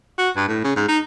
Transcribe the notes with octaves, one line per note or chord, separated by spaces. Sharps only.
F#4
G2
A2
C#3
G#2
D#4